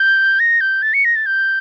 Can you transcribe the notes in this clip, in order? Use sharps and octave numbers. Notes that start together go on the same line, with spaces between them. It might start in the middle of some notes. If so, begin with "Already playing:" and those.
Already playing: G6
A#6
G6
A6
C#7
A#6
A6
G6